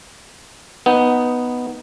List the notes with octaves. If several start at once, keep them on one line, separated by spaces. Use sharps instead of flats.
B3 D#4